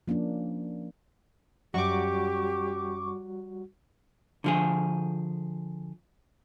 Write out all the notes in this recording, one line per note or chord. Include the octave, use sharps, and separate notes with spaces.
F3 A#3 C#4 D4
F#2 G3 F#4 G4 C#6 D6
D3 F3 G#4